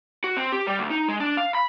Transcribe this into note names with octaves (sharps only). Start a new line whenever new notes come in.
F#4
C4
G4
G3
D2
D#4
G#3
D4
F5
B5